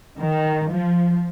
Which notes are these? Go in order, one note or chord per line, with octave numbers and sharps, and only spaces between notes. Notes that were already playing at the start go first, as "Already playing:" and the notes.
D#3
F3